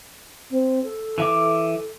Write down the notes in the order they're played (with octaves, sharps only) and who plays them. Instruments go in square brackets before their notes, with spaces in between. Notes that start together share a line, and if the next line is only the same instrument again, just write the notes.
[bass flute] C4
A4
[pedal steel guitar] E3 E5 D6